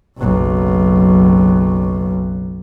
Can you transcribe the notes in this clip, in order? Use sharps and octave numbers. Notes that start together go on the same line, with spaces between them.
F#1 B1